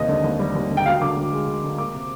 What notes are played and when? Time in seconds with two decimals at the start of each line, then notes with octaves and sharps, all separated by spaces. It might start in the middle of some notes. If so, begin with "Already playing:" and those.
Already playing: D#2 C3 D#5
0.08 D3
0.24 D#2
0.39 G3
0.55 D#2
0.70 D3
0.77 G5
0.86 D2 F5
1.01 D3 D6
1.17 D2
1.32 G#3
1.47 D2
1.63 D3
1.78 A#3 D6
1.94 C3